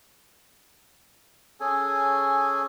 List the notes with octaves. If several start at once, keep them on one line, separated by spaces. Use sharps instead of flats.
C#4 G#4 A4 G#5